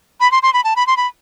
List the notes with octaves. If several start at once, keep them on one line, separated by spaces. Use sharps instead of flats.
B5
C6
C6
B5
A5
B5
C6
B5